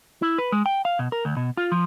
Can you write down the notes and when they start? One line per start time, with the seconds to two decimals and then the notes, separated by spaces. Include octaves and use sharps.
0.22 E4
0.38 B4
0.52 G#3
0.66 G5
0.85 F5
0.99 B2
1.12 A#4
1.25 D2
1.37 B2
1.57 F4
1.72 F3